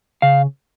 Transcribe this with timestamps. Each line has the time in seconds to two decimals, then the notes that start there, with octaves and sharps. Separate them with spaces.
0.22 C#3 F5